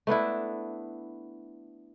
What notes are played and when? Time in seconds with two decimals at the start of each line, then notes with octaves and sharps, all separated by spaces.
0.07 A3 B3 D4 E4